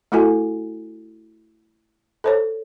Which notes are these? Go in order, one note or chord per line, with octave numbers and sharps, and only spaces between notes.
A3 E4 F#4 A4 G#5
A4 C5 C#5